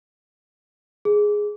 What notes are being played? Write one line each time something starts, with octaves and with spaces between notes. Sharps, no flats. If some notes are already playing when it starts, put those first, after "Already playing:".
G#4